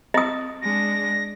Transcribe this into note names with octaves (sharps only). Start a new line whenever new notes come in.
C4 D#5 D#6
G#3 D4 A#6